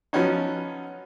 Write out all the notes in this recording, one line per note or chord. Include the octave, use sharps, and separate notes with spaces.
F3 F#3 B3 C#4 D#4